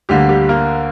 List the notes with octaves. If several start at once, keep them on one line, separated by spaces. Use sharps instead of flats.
D2 D3 G3 A#3 G4
G3 G4
A#3 A#4